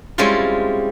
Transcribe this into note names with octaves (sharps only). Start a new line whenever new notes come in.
G3 G#3 C4 C#4 E4 F4